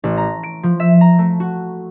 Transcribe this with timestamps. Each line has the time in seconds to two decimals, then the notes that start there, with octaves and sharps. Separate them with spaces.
0.04 A1
0.17 A#5
0.43 D7
0.63 F3
0.80 E5
1.01 A#5
1.18 A3
1.40 F#4